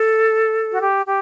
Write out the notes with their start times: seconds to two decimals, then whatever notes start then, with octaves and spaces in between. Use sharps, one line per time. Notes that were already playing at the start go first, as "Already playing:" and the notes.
Already playing: A4
0.72 F#4
0.80 G4
1.06 G4